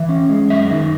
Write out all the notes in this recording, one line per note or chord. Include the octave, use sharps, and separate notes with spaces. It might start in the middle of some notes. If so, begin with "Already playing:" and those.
Already playing: E3 E5
C#4
G#3
F#2 E5
D#3